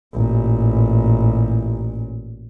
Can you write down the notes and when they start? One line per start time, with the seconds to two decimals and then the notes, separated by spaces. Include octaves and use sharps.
0.14 A1 A#2